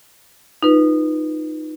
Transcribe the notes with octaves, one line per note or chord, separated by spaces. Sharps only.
D#4 F4 B4